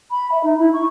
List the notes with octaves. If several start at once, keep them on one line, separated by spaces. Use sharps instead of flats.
B5
E5
D#4
E4
C#6